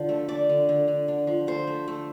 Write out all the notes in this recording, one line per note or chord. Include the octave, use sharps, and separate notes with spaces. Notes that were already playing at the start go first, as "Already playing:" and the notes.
Already playing: D3 F3
A3
A3 D5
D3
D3
D3
D3
F3
A3 C5
A3
A3